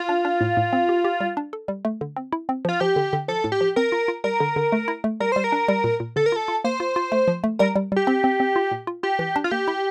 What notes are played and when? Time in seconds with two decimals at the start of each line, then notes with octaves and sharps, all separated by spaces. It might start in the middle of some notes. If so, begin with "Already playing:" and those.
Already playing: F4
0.09 D4
0.25 D4
0.41 A2
0.57 A2
0.73 C4
0.89 G4
1.05 G4
1.20 G3
1.37 D4
1.53 A4
1.68 G3
1.85 A3
2.01 D3
2.17 C4
2.33 E4
2.49 C4
2.65 F3 F4
2.80 F3 G4
2.96 D3
3.13 D3
3.28 F3 A4
3.44 A2
3.52 G4
3.61 F3
3.76 C4 A#4
3.92 F4
4.08 F4
4.24 G3 A#4
4.40 D3
4.56 D3
4.72 A3
4.88 E4
5.04 A3
5.20 G3 A#4
5.32 G3 C5
5.44 A#4
5.52 D4
5.68 G3
5.84 A#2
6.00 A#2
6.16 D3 A4
6.26 A#4
6.32 F4 A4
6.48 F4
6.64 A#3 C5
6.80 F4
6.96 F4
7.12 A3
7.28 F3
7.44 A3
7.59 G3 A#4
7.76 G3
7.92 G3 G4
8.07 C4
8.24 C4
8.40 C4
8.56 F4
8.72 A#2
8.87 F4
9.03 F4 G4
9.19 E3
9.36 D4
9.44 F4
9.51 A#3 G4
9.68 E4